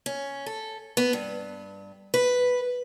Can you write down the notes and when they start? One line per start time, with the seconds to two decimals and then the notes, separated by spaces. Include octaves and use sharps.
0.06 C#4
0.46 A4
0.97 B3
1.13 G2
2.14 B4